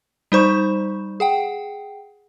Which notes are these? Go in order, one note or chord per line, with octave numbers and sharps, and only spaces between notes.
G3 D#4 C5 C#6
G#4 F#5 G5